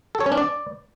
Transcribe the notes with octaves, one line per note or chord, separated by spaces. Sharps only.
A4
C#5
C#4
D4
D5